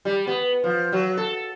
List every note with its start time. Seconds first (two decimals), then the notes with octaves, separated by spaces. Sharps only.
0.05 G3
0.27 B3
0.64 F3
0.92 F#3
1.17 A4